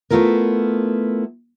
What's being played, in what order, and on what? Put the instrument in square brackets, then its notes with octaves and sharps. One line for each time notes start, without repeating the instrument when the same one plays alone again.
[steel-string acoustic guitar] A3 B3 E4 F4 A#4